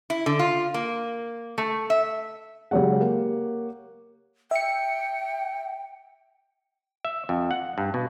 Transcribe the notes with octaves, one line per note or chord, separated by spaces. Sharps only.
E4
D3
F4
A#3
A3
E5
C#3 F#3 G#3 G4 C#5 F#5
A#3
E5 G5 C#7
E5
F2
F#5
G2
B2